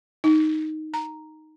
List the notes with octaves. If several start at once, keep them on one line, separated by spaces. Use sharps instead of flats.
D#4
A#5